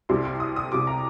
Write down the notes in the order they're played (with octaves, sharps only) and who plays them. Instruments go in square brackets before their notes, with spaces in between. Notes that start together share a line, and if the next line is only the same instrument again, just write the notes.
[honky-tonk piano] C2 C3 G3 C6
C6
D#6
D#6
C2 C3 G3 D6
A#5